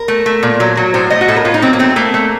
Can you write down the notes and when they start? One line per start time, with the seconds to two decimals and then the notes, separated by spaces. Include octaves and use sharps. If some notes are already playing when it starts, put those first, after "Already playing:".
Already playing: A#4
0.08 A3
0.26 A3
0.43 A#2
0.60 F#3
0.77 F#3
0.94 A2 C5
1.10 A3 D#5
1.21 F#4
1.28 A2 A4
1.36 A#4
1.45 A2 F4
1.54 D#4
1.62 F#3 C4
1.73 A#3
1.79 A3 C4
1.96 A3 A#3
2.14 A3